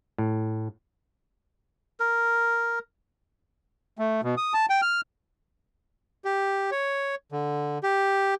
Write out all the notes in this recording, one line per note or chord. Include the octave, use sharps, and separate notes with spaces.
A2
A#4
A3
B2
D#6
A5
G5
F6
G4
C#5
D3
G4